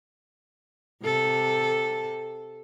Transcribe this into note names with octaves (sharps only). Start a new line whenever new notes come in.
C3 A4